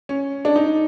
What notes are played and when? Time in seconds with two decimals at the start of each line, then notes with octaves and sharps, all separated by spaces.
0.09 C#4
0.45 D4
0.56 D#4